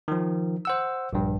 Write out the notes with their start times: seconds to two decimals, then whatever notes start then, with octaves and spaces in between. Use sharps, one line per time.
0.08 D#3 F3
0.65 C5 F#5 E6
1.13 A#1 G2